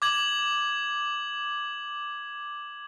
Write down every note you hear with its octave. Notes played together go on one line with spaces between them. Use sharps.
D6 G#6 F#7